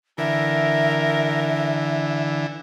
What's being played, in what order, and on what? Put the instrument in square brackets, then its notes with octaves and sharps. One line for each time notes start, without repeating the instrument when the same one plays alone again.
[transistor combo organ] D3 E3 [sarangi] A#4 [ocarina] E5